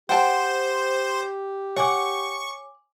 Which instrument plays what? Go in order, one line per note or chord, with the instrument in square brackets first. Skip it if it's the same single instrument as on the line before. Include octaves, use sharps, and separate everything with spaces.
[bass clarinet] G4 [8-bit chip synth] C5 [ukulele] F#5 G5 A5
[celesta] C#5 G#5 D6 [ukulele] F#5 [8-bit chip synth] C#6